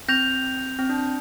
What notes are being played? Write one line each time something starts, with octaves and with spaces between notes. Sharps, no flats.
C4 G6 A#6 F7
C4
D4